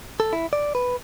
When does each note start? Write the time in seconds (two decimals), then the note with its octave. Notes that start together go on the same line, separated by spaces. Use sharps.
0.20 A4
0.33 E4
0.53 D5
0.75 B4